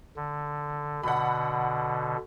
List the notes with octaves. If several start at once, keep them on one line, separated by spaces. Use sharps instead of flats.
D3
B2 D3 F#5 B5